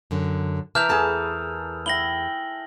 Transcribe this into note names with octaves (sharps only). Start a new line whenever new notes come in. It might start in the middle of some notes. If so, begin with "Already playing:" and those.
F#2 D3
E3 A#4 B4 A5 F6 G6 F7
E2 G#4 A4 A5
E4 G5 A#6 F#7 G7